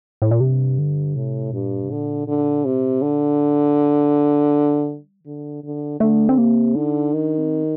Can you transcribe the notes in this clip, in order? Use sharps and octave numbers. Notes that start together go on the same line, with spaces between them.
A2
A#2
G2 C3
D3
A2 C3
G2 A#2
C3
A#2 D3
D3
C3
D3
A2
G3
D#3
D3 F3
D3 G3
D3 A3
C4
C3 A#3
D3 D#4
D#3 D4
C4